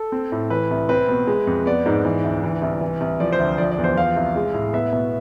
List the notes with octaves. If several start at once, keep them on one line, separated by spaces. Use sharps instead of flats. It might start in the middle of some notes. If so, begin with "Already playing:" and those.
Already playing: A4
C4
A2
E3 B4
C2
C4 B4
B2
G#3
F2
B3 D5
G#2
E3
D2
E3
C2
E3
C2
F3 D5
C5
D2
F3 D5
D5
E2
C5
F3 F5
C2
G#3
A2
B3 E5
B2